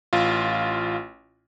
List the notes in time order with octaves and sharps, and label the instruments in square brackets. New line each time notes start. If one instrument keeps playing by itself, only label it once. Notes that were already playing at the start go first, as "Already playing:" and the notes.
[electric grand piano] A1 F4